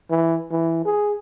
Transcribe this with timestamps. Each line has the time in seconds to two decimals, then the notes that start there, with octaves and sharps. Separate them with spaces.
0.10 E3
0.51 E3
0.85 G#4